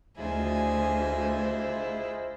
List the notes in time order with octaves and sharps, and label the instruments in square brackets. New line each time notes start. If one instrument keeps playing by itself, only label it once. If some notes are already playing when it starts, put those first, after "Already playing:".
[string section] D2 [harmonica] E4 C5 [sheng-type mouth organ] F4 G#4 D#5 [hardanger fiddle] G#5